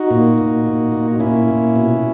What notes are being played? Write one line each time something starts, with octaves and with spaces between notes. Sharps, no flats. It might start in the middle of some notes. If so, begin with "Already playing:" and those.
Already playing: D#4 F#4
A#2
A#2
A#2
A#2
A#2 C#4 E4
A#2
B2